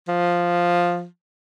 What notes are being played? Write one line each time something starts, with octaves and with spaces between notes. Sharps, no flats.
F3